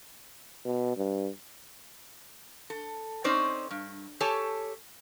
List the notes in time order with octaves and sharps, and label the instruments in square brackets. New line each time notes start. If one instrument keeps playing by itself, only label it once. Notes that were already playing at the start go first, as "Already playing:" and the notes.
[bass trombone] B2
G2
[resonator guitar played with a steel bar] A4
C4 C#4 D#4 C5 D5
G2
G4 A4 C#5 G#5 A5